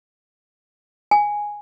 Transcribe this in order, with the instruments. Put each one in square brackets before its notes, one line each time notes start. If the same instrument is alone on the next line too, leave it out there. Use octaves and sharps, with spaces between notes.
[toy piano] G#5